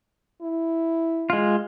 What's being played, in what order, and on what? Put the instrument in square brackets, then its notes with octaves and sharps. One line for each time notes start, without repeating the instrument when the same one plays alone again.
[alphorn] E4
[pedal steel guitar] G#3 F4